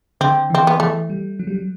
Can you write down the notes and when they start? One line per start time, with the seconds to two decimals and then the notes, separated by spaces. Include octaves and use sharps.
0.21 D3 C4
0.50 E3 C4
0.67 B3
0.80 E3 A3
1.10 G3
1.39 F#3
1.47 G3
1.55 F#3